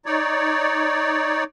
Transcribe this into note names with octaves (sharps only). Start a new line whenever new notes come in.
D#4 C#5 D5